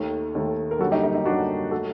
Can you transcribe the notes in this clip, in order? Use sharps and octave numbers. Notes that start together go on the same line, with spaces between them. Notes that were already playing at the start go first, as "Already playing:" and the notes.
Already playing: D#2 D#3 A3
D#2 D#3 A3
A#4
F#2 D3 G3 A#3 F#4 A4
D#4 G4
D#4
D#4
F#2 D3 G3 A#3 D4 F#4
F#4 A4
F#3 A3